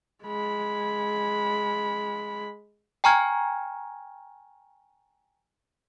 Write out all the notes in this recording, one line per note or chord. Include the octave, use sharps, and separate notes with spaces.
G#3 B5
G5 G#5 A#5 C#6 F6 G#6